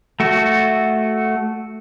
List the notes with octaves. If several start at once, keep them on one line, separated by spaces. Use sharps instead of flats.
A3 F#4